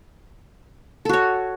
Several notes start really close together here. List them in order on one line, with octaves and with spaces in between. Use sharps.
A4 F#4 C#5